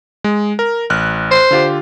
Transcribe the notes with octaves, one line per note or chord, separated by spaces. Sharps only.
G#3
A#4
A1 F6 F#6
C5
D3 F4 G4